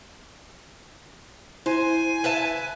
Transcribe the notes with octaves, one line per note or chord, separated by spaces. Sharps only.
E4 C5 G#5
B4 E5 A5